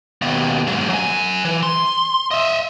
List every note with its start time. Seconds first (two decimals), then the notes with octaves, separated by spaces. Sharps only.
0.22 D#2 B2
0.67 G#2 F#3
0.90 F#3 G#5
1.45 E3
1.63 C6
2.31 D#5 E5